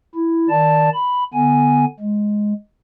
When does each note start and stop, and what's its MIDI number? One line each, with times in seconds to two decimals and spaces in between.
0.15 0.49 64
0.49 0.90 51
0.49 0.90 74
0.49 0.90 81
0.93 1.24 83
1.34 1.85 50
1.34 1.85 59
1.34 1.85 80
1.99 2.53 56